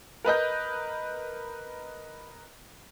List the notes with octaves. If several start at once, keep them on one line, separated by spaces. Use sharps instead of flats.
A#4 B4 D#5 G6